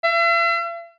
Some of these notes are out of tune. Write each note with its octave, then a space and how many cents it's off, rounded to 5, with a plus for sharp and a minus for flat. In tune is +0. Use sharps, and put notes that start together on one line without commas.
E5 +45